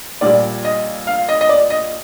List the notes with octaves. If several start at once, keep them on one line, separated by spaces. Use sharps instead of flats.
A#1 A#2 G3 D5
D#5
F5
D#5
D#5
D5
D#5